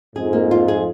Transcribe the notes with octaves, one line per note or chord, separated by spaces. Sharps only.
F2 G#2 G#4
A#3
F4
G#4